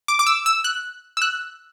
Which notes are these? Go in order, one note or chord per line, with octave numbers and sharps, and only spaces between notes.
D6
D6
E6
E6
F#6
E6
F#6